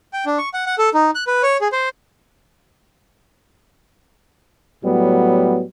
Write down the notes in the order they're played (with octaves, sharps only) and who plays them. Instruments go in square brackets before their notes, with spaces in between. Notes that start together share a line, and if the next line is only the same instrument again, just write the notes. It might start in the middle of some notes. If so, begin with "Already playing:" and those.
[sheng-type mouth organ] G5
D4
C#6
F#5
F#5
A4
D#4
F#6
B4
C#5
G#4
C5
[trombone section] A2 F#3 G3 B3